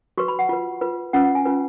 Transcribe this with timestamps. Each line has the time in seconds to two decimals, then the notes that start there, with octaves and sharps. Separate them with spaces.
0.18 F#4 B4 C#6
0.28 B5
0.39 F#5
0.49 F4 B4
0.81 F4 B4
1.13 C#4 F4 B4 F#5
1.24 F#5
1.35 G#5
1.45 C#4 F4 B4